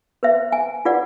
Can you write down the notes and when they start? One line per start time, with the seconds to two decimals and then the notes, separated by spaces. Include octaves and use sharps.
0.23 B4 C5 E5
0.52 G#5
0.85 F4 B4 D5 F#5